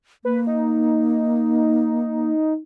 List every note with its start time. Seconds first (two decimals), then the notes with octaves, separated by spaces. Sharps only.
0.25 A#3 B4
0.47 D#4